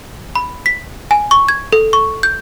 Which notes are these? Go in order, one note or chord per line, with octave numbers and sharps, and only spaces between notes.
B5
B6
G#5
C#6
G#6
A4
C#6
G6